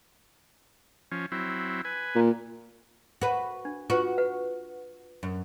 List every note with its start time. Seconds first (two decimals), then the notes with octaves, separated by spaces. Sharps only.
1.12 F3 C#4
1.32 F#3 C4 E4
1.85 B4 G#5
2.15 A#2
3.21 F#4 B4
3.65 D4
3.90 F4 F#4 B4
4.18 B4 F#5
5.23 F#2